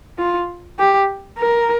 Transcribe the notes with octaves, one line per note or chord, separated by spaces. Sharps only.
F4
G4
A#4